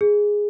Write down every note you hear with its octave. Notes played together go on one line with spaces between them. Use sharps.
G#4